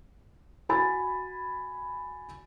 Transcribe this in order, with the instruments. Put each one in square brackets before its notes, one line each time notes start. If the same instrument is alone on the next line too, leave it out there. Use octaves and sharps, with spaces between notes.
[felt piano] F#4 G#5 B5 A6